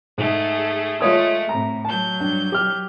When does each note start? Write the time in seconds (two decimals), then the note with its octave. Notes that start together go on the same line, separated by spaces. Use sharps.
0.18 G#2 A3 G#4 A4
1.01 G#3 A3 F4 C#5 D#6
1.49 A2 C3 A#5
1.85 F#3 A5 G6
2.20 G2
2.52 G4 F6